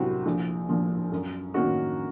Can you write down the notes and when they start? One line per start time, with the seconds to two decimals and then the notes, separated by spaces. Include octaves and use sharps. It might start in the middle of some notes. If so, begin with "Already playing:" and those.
Already playing: C2 C3 F#3 C4 F#4
0.26 A#1
0.69 A#2 F3
1.12 F#2
1.54 D#3 A#3 C#4 F#4